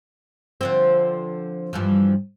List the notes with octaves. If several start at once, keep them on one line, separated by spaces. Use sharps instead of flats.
D3 F3 C4
G2 E3 F3